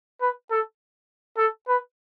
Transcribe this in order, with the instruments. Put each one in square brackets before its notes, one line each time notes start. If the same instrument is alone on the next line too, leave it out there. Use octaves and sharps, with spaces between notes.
[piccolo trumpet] B4
A4
A4
B4